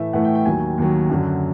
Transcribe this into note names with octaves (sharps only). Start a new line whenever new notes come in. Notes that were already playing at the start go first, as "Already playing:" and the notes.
Already playing: A2 E3 A3 E5
A2 E3 A3 F#5
G5
G5
D#2 D#3 F#3 G#5
D#2 D#3 F#3
F#2 D3 F#3